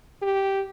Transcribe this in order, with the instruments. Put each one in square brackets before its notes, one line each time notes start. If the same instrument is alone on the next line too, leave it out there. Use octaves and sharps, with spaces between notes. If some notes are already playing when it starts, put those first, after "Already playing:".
[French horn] G4